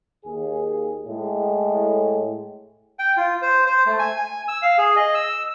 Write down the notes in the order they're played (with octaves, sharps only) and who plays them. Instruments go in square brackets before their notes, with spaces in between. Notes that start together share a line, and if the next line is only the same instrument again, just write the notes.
[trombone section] D#2 G#4
A2 G#3
[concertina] G5
F4
C5
C5
A3
G#5
G#5
E6
F5
G#4
D#5
E6